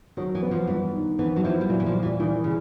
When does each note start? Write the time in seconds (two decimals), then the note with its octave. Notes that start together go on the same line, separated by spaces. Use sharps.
0.17 D#3 F#3
0.35 E3
0.43 B3
0.51 F3
0.67 G2 E3
0.93 D#3
1.19 E3 B3
1.36 F#3
1.44 F3 E4
1.61 G3
1.70 A#2 F#3
1.80 E3
1.86 F3
1.95 G3
2.03 E3
2.20 D#3 E3
2.44 C#3